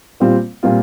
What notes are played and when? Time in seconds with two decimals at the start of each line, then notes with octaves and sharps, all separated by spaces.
0.20 A#2 G3 C4 F4
0.63 A#2 G3 C4 F4